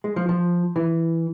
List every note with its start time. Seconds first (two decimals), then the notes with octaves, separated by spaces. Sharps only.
0.04 G#3
0.16 F3
0.29 F3
0.76 E3